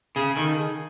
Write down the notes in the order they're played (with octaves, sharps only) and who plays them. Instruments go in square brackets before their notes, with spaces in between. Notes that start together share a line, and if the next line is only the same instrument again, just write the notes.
[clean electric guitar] C#3 [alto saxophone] G#4
[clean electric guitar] D#3 [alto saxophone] A4
[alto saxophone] G#4